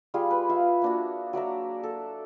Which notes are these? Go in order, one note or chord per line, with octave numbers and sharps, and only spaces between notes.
G3 F4 G#4
B4
F4 E5 F5
A#3 D4 F#4
F#3 D5 E5 A#5
A4